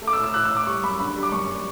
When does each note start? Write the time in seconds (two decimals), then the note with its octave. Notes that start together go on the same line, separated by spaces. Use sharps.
0.02 A3
0.07 D6
0.13 E6
0.18 A2
0.24 E6
0.34 A2 F#6
0.45 E6
0.50 A2
0.56 D6
0.67 G3 C#6
0.83 F#2 B5
1.00 D3 B5
1.16 G3
1.23 D6
1.32 F#2 C#6
1.48 G3